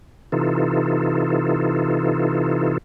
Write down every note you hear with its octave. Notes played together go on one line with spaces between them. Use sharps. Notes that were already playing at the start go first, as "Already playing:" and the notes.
C3 E3 D#4 F4 A4